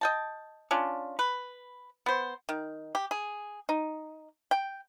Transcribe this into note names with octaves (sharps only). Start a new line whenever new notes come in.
D#5 G5 A5
C#4 D4 F4
B4
B3 C5
D#3
G4
G#4
D#4
G5